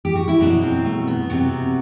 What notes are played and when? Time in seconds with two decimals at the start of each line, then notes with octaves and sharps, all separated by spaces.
0.05 G4
0.15 F#4
0.28 E4
0.40 B2 F#3 D4
0.62 C4
0.85 A3
1.07 B3
1.30 C3 F#3